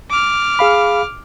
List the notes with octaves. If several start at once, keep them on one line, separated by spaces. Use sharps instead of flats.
D6 F6
G#4 F5 B5